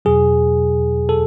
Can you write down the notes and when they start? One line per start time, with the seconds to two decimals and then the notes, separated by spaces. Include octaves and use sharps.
0.05 E2 B2 F#3 G#4
1.09 A4